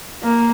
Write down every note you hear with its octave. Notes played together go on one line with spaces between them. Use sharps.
A#3